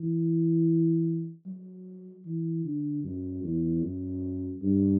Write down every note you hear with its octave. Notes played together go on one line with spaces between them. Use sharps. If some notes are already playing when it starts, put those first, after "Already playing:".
Already playing: E3
F#3
E3
D3
F#2
E2
F#2
G2